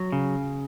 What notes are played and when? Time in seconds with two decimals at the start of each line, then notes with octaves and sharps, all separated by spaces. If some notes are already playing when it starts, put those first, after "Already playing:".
Already playing: F#3
0.12 C#3